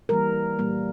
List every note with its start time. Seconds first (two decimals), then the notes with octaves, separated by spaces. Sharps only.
0.09 E3 G3 A#3 A#4
0.59 A#2 G3 A#3